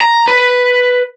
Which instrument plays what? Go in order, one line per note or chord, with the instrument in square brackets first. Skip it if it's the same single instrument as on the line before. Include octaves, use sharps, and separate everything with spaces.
[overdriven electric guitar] A#5
B4